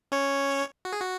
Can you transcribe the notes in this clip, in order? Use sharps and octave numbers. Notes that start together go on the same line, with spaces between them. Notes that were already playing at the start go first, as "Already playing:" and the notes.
C#4 C#5
F#4
G#4
F#4